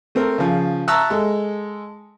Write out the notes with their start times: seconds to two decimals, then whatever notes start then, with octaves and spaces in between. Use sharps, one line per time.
0.15 A3 C4 A4 A#4
0.38 C#3 F3
0.88 E5 A5 A#5 C#6 E6 F#6
1.10 G#3 A4